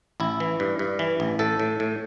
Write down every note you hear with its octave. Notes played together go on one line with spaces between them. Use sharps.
A1 E4
E3
G2
G2
E3
A1
A2 A4
A2
A2